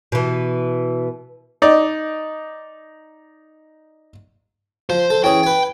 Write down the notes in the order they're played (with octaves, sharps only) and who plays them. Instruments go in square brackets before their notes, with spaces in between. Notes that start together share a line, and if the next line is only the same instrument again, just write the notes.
[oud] B2 E3
[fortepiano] D#4 D5
[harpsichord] F3 [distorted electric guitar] C5
[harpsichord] A4
[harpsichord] E3 C#4 G#4 [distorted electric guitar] G5
[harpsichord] B4 G#5